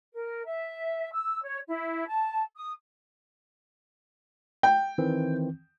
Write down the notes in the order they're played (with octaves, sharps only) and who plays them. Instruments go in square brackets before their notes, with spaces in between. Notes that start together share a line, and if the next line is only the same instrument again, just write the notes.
[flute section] A#4
E5
E6
C#5
E4
A5
D#6
[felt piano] G5
[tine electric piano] D#3 E3 C4